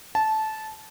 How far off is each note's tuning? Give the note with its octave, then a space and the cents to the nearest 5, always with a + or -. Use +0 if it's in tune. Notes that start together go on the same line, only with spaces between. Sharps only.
A5 -15